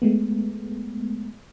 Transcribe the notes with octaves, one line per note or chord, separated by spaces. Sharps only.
G#3 A3 B3